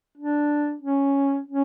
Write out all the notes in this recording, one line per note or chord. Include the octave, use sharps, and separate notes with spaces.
D4
C#4
C#4